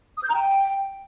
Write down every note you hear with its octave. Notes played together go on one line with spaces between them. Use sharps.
D#6
G6
A#5
G5